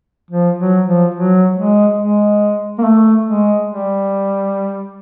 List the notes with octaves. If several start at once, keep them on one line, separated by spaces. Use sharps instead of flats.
F3
F#3
F3
F#3
G#3
G#3
A#3
A3
G#3
G3